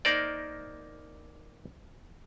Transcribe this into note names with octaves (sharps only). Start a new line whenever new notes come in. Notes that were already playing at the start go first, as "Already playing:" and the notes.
A#3 D#4 A#4 C5 D5